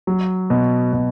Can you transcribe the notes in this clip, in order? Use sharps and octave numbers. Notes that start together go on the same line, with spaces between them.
F#3
B2
B2